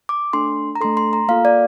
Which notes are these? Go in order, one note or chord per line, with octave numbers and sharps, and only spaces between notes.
D6
A3 D4 A4 C6
A#5
A3 D4 A4 C6
C6
A#5
A#3 F4 A4 F5
D5